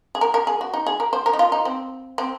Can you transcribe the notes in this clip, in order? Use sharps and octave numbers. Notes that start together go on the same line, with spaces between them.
G#4
A#4
A#4
G#4
F#4
D#4
G#4
A#4
C5
A#4
D#4
F4
D#4
C4
C4